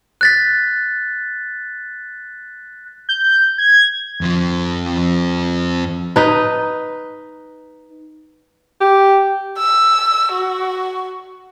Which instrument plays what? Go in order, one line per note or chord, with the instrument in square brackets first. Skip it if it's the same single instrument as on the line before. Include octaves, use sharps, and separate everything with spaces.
[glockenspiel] F#6 A6 B6
[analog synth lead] G6
G#6
[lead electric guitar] F2 F3
[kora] D#4 B4
[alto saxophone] G4
[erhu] E6
F#4